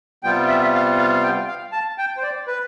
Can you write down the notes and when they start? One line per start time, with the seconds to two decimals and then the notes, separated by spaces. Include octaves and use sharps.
0.23 C3 G3 B3 F4 G5
0.48 E5
0.74 F5
0.98 F5
1.14 F5
1.23 G5
1.47 F5
1.72 A5
1.98 G5
2.17 C5
2.23 D5
2.47 B4